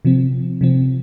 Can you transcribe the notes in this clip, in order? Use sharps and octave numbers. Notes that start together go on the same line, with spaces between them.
C3 F3 C4
C3 F3 C4